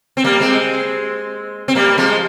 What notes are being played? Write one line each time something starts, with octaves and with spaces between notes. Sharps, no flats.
C4
G3 A#3
G#3 C4
C4
G3 A#3
F3 G#3